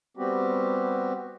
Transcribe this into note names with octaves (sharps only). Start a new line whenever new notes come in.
G3 B3 C4 F#4 G4